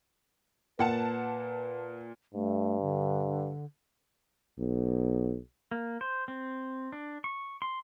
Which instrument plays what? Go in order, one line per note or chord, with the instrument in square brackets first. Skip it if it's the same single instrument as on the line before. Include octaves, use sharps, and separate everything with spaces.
[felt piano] A#2 C#7 [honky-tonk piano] A#3 F#5 A5 [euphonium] B4
[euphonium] G2 [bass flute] A3
[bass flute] D3
[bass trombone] B1
[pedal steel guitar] A#3
C5
C4
D4
C#6
C6